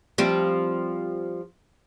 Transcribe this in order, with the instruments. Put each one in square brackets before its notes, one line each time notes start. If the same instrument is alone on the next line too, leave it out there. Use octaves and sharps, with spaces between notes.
[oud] F3 G3 C4